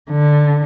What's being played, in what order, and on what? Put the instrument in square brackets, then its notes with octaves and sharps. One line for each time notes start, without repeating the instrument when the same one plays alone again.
[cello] D3